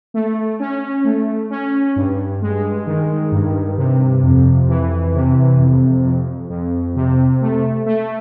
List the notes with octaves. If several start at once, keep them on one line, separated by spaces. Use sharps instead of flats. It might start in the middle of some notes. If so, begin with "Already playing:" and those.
A3
C#4
A3
C#4
G2
G#3
D#3
G2
C3
F2
E3
C3
F2
F2
F2
C3
A3
A3